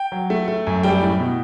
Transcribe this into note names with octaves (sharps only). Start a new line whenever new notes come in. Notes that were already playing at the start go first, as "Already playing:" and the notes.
Already playing: G5
F#3
A3
A3
F#2
G3 G5
A2
B2